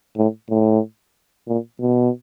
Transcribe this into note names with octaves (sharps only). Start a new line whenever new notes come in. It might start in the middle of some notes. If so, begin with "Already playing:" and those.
A2
A2
A#2
B2